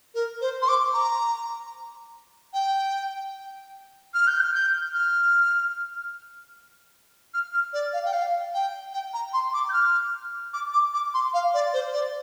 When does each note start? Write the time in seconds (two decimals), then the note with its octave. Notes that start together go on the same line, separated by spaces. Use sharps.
0.14 A#4
0.41 C5
0.62 C6
0.68 D6
0.93 A#5
2.53 G5
4.14 F6
4.27 G6
4.40 F6
4.54 G6
4.94 F6
7.34 F6
7.54 F6
7.73 D5
7.93 F5
8.05 G5
8.13 F5
8.54 G5
8.93 G5
9.13 A#5
9.33 C6
9.54 D6
9.69 G6
9.73 F6
10.53 D6
10.73 D6
10.94 D6
11.14 C6
11.34 F5
11.54 D5
11.73 C5
11.93 D5